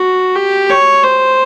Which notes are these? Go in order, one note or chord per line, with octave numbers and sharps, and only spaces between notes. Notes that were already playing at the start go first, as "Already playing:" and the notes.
Already playing: F#4
G4
C#5
C5